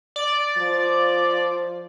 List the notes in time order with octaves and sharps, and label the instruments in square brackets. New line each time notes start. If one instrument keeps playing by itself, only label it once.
[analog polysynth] D5
[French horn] F3